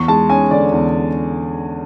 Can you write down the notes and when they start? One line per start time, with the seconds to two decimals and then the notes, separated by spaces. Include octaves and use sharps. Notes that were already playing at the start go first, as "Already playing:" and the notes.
Already playing: E2 C#6
0.08 G#3 A5
0.29 C#4 G#5
0.51 D3 D5
0.72 E2